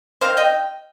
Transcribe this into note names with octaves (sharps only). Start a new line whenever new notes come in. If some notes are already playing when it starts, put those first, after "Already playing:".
D#3 C4 C5 F5
D#5 G5